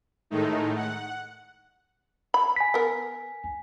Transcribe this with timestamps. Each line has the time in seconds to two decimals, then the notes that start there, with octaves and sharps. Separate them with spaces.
0.30 A2 D#3 G#3 A3 D#4
0.75 F#5
2.34 B5
2.56 G#5 B6
2.74 B3 A#4